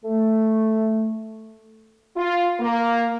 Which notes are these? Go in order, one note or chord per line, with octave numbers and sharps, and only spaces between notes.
A3
F4
A#3